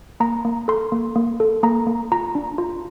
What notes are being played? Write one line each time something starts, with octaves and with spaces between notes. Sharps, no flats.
A#3 A#5
A#3
A4 C6
A#3
A#3
A4
A#3 A#5
A#3
F4 A#5
D4
F4